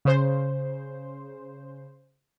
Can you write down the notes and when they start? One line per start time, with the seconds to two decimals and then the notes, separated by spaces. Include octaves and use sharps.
0.05 C#3 C5